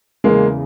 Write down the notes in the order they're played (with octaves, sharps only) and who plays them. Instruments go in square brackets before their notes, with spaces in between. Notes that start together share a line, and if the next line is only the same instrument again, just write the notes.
[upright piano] E2 C#3 E3 G#3 A#3